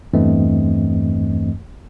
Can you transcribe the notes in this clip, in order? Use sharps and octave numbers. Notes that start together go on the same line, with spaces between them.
E2 G2 E3 A3 C4 D#5